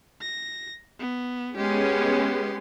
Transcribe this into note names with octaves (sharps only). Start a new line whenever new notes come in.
A#6
B3
G#3 B3 C#4 G4 C6